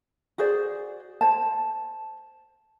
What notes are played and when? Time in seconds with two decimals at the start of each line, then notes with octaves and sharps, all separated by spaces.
0.38 F#4 G#4 C5 D5
1.21 C5 A5